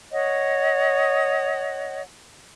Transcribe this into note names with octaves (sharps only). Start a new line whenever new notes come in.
C#5 D#5 F#5